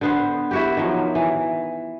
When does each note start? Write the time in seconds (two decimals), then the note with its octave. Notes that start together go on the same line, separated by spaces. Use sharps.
0.01 D3 B3 C5
0.51 E4 F#4 G4
0.77 D#3 F3 F#3
1.15 E3